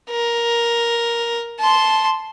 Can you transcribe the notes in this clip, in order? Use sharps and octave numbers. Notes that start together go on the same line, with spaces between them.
A#4
A5 C6